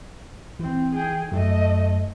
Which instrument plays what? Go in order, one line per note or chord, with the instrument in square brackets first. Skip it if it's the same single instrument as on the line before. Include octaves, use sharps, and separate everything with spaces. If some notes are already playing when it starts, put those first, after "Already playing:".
[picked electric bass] E3 [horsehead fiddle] C4
[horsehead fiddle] G#4 G5
[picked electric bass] F#2 F#3 [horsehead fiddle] A3 D#5